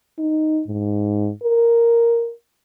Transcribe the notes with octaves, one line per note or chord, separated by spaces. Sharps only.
D#4
G#2
A#4